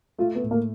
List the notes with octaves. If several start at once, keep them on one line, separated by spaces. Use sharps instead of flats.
A3 F4
B3
A2
A#3